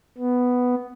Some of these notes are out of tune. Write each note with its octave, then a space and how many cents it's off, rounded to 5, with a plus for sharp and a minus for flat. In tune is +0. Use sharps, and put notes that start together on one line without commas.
B3 +5